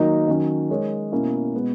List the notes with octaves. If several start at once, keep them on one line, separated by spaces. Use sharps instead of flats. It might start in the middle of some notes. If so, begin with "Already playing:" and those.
Already playing: D#3 F#3 A#3 D#4
D#3 F#3 C#4
G#3 D#4 A#4 C#5
B2 A#3 C#4 E4
B2 G#3 B3